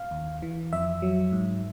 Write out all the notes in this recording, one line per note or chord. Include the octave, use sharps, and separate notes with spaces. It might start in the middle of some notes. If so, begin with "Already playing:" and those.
Already playing: F5
D#2
E3
F2 E5
F#3
G#2